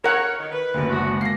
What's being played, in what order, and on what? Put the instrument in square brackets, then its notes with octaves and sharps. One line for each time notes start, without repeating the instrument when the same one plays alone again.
[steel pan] A#4 F#5 [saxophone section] C#5
[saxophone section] D#3
B4
[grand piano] F#1 D2
[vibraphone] G#3 D6 [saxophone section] B3 E4 F#4
[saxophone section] A#3 [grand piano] A#6 C7